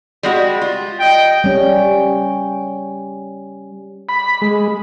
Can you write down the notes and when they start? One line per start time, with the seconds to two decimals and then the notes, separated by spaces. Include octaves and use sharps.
0.23 G3 G#3 F#4
0.62 F4
1.00 D#5 G5
1.44 G3 C#4
4.09 B5
4.41 G#3